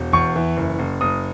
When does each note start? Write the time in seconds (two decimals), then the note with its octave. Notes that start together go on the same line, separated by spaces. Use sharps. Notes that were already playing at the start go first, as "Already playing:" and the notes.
Already playing: E1
0.13 E2 C#6
0.36 E3
0.57 F#1
0.79 F#1
1.01 F#1 D#6